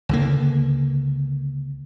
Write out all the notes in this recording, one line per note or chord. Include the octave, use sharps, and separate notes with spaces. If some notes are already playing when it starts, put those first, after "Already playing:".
C#2 D3 A#3